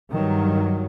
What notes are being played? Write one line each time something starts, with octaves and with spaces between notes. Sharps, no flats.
G2 D#3 F#3